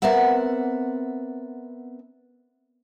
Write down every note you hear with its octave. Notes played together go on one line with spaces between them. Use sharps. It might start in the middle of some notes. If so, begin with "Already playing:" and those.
B3 C4 A#4 D5 E5 F#5